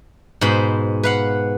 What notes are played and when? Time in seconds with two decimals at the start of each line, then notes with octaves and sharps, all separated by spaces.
0.41 G#2 B2 C5 B5
1.03 B4 F5 F#5